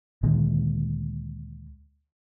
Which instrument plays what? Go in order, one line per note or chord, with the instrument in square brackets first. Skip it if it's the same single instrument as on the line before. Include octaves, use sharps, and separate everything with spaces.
[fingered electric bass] D2 A#2 D#3 G#3